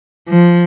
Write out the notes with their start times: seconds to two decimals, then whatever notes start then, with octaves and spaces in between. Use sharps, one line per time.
0.29 F3